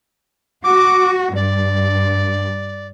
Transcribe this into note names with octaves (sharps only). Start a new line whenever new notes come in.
F#4 D6
G2 D5